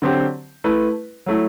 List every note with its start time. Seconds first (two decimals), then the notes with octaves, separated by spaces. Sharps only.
0.02 D3 F#3 C4 G4 C5
0.64 A3 E4 B4
1.26 F#3 A3 E4